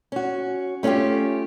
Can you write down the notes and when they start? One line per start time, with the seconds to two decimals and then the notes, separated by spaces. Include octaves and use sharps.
0.12 C#4 F#4
0.83 A3 C#4 D4 F4 G4